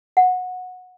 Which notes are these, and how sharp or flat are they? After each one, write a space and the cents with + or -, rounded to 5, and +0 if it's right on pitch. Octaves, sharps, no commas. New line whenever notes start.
F#5 -15